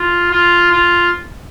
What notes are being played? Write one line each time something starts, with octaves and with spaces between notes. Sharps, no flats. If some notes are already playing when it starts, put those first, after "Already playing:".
Already playing: F4
F4
F4